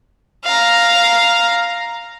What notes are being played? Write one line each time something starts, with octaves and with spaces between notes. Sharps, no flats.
F5 A#5